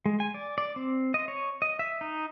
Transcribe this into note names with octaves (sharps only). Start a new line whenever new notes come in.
G#3
G#5
D5
D5
C4
D#5
C#5
D#5
E5
D#4